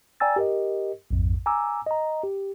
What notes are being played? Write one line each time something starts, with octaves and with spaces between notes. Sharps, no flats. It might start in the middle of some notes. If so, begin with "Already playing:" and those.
D5 G5 G#5 A#5 E6 A6
G4 A#4 D#5
A#1 F2 G#2
G#5 A#5 D6 E6
D#5 A#5
G4